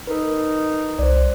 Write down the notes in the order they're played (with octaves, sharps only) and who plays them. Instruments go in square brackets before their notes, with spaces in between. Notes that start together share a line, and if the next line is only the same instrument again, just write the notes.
[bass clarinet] D#4 [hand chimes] A#4 B4
[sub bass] C2 [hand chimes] C5 D5